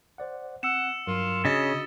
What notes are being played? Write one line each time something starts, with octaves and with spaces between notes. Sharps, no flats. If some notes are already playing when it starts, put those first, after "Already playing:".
C5 D5 F#5
C4 F#5 E6 C#7 E7
G2 F#3 F4 A#4
C#3 D4 F#4 D#5 A6